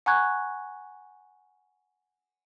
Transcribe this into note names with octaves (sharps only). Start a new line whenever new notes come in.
F#5 G#5 A#5 C#6 F#6 G#6